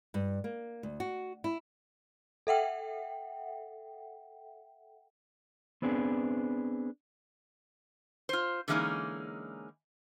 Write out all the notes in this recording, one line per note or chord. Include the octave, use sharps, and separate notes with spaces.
G2
A#3
D2
F#4
E4
A4 E5 F#5 G5
B3 C4 D4 G#4 B4
F4 C5
D3 E3 G#3 A#3 C#4 D#4